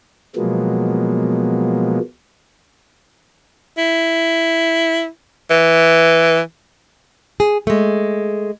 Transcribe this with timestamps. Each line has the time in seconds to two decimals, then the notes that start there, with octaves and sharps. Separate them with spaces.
0.36 B2 F3 F#3 G#3 A#3 B3
3.78 E4
5.50 E3
7.40 G#4
7.67 G#3 A3